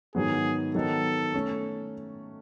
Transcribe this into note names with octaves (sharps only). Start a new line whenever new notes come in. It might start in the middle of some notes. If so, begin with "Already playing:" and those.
G#2 D#3 F#3 B3 G#4
D#3 F#3 B3 D#4 A4
A3 C#4